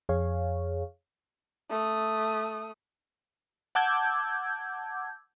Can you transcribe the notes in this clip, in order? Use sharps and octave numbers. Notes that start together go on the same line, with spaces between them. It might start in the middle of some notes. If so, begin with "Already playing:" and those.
F2 G#4 C#5 F5
A3 D#6
F#5 A5 D6 E6 G6 G#6